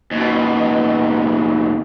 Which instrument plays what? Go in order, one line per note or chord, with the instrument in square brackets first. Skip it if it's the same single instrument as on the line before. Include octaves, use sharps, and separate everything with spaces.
[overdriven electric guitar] D#2 B2